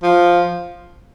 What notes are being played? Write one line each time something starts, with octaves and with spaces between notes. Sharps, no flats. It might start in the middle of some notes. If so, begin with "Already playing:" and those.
F3